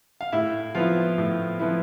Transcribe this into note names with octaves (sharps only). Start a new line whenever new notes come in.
F5
A2 E4 E5
F3 B3 E4 F4 F5
A2
F3 B3 E4